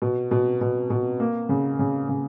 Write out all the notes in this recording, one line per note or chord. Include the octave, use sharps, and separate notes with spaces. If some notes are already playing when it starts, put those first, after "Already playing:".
B2
B2
B2
B2
A#3
C#3
C#3
C#3